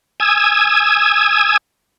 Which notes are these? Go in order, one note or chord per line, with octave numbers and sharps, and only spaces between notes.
G#5 D#6 E6 G#6